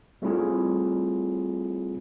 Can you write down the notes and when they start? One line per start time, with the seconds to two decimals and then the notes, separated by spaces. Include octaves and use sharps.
0.22 G3 A3 C4 E4 F4 G#4